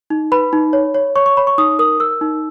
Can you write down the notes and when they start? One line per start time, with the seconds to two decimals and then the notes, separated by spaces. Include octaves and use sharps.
0.10 D#4
0.32 B4 B5
0.53 D#4
0.73 C#5
0.95 C#5
1.16 C#5 C#6
1.26 C#6
1.37 C#5 B5
1.47 C#6
1.58 D#4 D#6
1.79 A#4 D#6
2.00 A#4 E6
2.21 D#4